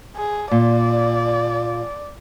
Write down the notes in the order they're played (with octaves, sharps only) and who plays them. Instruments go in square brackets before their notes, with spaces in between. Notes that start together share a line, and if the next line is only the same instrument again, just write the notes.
[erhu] G#4
[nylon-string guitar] A#2 [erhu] D5